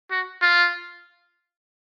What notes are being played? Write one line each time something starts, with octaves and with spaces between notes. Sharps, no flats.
F#4
F4